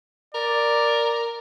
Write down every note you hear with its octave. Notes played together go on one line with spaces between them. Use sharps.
A#4 D5